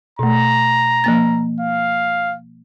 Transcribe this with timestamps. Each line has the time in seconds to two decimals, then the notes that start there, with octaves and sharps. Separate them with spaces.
0.19 B2 A3 A#5
1.04 F3 A#3 A6
1.60 F5